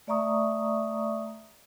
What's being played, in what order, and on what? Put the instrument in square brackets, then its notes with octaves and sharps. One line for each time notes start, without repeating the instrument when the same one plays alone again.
[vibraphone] A3 D5 E5 A#5 C#6 D#6